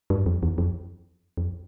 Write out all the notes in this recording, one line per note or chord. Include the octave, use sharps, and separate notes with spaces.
G2
F2
E2
F2
F2